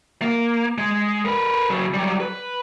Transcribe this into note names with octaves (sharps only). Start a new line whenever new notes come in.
A#3
G#3
A#4 B4
C#3 F#3
F#3 G3
B4